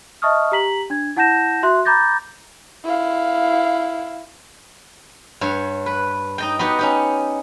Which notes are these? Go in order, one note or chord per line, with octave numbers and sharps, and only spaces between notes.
D#5 E5 A5 C#6 D#6 F6
G4 A#5 B6 F#7
D4 G#6
E4 F#5 A5 G6 A#6 E7
F#4 E5 C6 F#6
A#5 B5 D6 G6 A6 A#6
E4 F5
G2 C#5
B4
D#4 D#5 G5
B3 D#4 F#4 G4
C#4 D#4 G4